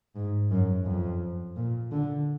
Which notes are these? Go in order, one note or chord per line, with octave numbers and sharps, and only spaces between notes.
G#2
F#2
F2
A#2
D3